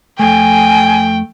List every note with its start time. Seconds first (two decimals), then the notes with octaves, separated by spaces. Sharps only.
0.19 F2 A3 G5 G#5